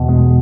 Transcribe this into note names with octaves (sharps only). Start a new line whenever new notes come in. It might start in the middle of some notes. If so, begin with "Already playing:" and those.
Already playing: E2 B2
G#3